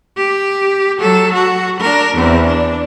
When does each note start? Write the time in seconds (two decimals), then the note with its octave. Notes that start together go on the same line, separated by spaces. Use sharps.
0.17 G4
0.99 F#3 A4
1.33 F#4
1.80 D4 A#4
2.15 E2 C4
2.46 D4